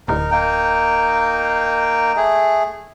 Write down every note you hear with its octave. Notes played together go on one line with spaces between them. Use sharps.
D1 D#4 A#4
A#3 D#4 G5
A3 G#4